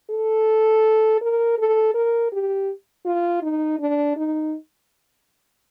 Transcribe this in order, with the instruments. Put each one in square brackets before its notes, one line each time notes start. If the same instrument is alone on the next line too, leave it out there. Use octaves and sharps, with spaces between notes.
[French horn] A4
A#4
A4
A#4
G4
F4
D#4
D4
D#4